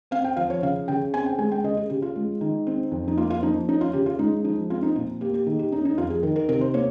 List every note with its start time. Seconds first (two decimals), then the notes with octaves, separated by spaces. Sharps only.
0.11 C4 F5
0.24 G5
0.37 F3 F5
0.50 C#5
0.62 C#3 F5
0.88 C#3 G5
1.14 C4 G#5
1.26 G5
1.38 G#3 G#5
1.52 G5
1.64 C#3 D#5
1.77 G#4
1.90 C#3 G4
2.02 F4
2.16 G#3
2.41 D#3
2.67 C4
2.92 F2
3.08 D#4
3.17 A#3 F4
3.30 F4
3.43 F3 D#4
3.69 C#4 D#4
3.81 F4
3.93 C#3 G4
4.06 F4
4.19 G#3 D#4
4.44 F3 D#4
4.70 C4 F4
4.83 D#4
4.96 A#2 F4
5.21 A#3 G4
5.34 G4
5.47 D#3 G#4
5.59 G4
5.72 C#4 D#4
5.85 D#4
5.98 F2 F4
6.10 G#4
6.23 D#3 A#4
6.36 A#4
6.49 C3 A#4
6.61 C5
6.74 A#3 C#5